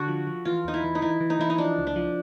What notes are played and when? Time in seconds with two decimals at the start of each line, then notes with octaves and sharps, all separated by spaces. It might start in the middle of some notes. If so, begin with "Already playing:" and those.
Already playing: D3 F#4 A4
0.08 F3
0.27 F3
0.45 E3 F4
0.64 E2 D#4
0.74 E4
0.84 E3
0.95 D#4
1.02 E3 E4
1.20 E3
1.30 D#4
1.39 E3 E4
1.50 D#4
1.58 F3 D4
1.77 C#2
1.87 D4
1.96 F3